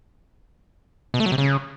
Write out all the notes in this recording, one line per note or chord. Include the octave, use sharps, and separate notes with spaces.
B2
A3
F#3
C3
C#3